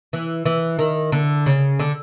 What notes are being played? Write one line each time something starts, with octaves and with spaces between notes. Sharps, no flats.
E3
E3
D#3
D3
C#3
D3